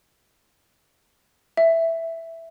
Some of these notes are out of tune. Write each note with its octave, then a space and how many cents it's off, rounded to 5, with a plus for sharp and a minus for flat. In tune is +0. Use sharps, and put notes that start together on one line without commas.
E5 +0